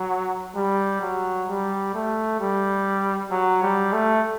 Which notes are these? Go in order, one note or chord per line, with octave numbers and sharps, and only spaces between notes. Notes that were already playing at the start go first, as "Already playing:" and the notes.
Already playing: F#3
G3
F#3
G3
A3
G3
F#3
G3
A3